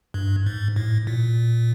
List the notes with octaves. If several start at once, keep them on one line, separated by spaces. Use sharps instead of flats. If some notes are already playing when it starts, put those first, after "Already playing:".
G2
G#2
A2
A#2